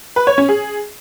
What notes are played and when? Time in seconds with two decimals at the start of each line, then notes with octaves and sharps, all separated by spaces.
0.16 B4
0.27 C#5
0.38 C#4
0.49 G#4